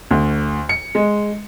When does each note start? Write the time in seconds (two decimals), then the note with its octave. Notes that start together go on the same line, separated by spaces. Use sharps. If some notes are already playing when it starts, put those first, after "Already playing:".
0.11 D2
0.69 C#7
0.95 G#3